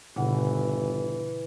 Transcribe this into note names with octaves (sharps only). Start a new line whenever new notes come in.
G1 A#2 C#3 E3 F#5